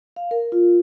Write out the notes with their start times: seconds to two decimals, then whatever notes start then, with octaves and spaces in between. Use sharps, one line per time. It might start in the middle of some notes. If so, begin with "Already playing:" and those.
0.16 F5
0.31 A#4
0.52 F4